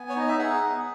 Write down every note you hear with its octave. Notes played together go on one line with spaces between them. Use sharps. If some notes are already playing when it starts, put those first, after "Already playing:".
Already playing: B3 G#5
C#5
D#4 D#5
E5
G#4 F#5
B3